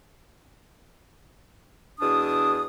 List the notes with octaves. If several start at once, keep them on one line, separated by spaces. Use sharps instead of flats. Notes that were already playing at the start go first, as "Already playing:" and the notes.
E2 B2 D4 D#6